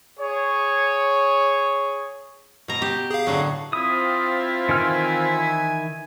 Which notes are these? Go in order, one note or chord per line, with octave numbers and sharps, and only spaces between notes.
G#4 C#5
B2 A#5
G4
G#4 F5
A2 D3 F#3
C4 E4 F4 D#6
D#3 E3 G#5 F6